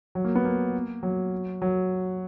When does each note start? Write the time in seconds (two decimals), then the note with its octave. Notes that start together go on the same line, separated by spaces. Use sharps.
0.15 F#3
0.25 A#3
0.35 B3
0.45 A#3
1.03 F#3
1.62 F#3